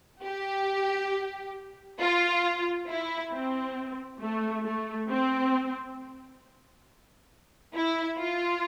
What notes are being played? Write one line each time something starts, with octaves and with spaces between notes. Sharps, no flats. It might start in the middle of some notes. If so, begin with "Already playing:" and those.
G4
F4
E4
C4
A3
A3
C4
E4
F4